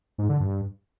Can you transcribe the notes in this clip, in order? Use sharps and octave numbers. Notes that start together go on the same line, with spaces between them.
G#2
D3
G2